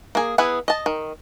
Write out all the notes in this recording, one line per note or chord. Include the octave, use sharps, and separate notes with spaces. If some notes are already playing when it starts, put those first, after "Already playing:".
A#3 G#4
B3 E4 G#4 B4
D#5 A5
D#3